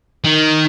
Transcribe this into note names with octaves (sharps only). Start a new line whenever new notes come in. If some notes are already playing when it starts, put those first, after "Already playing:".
D#3